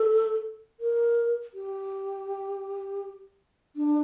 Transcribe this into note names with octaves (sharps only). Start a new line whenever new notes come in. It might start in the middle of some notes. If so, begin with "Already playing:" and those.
Already playing: A4
A#4
G4
D4